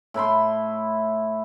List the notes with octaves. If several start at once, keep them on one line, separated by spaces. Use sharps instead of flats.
A2 E4 B5 C6